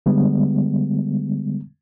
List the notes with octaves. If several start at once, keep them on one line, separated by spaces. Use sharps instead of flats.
D3 G3 G#3 B3